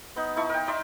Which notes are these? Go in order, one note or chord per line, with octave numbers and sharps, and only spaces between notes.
B3 D#4
D#4 E4 A5 C#6
A#4 G5
D#4 D5 E5 C6